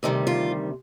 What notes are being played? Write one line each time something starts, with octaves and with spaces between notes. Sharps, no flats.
D2 C3 D#3 G3 D#4
F4